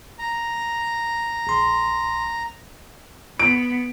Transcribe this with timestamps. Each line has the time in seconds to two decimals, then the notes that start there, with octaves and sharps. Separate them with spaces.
0.19 A#5
1.47 A#1 C6
3.39 B3 D7